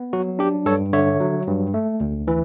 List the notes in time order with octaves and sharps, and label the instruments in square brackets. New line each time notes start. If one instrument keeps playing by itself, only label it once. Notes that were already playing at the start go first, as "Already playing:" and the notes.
Already playing: [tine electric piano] B3
F#3 F#4
D4 G4
G2 A4 C#5
D3 C#5 E5
F#3
G2
A3
D2
E3